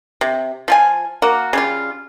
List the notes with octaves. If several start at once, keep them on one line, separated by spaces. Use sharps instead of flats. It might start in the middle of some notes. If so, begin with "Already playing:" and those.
C3
F3 F4 G#5
A#3 F#4
C#3 G3 F4